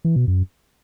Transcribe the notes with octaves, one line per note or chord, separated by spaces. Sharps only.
E3
B2
F#2